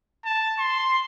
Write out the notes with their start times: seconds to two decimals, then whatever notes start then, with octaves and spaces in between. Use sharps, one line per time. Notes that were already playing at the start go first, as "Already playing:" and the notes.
0.25 A5
0.59 C6